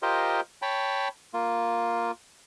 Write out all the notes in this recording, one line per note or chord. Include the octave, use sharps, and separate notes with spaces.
F4 G4 A#4 C5 D#5
C#5 G5 A5 B5
A#3 F4